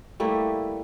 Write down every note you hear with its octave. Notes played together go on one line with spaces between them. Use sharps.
G3 A3 A#3 E4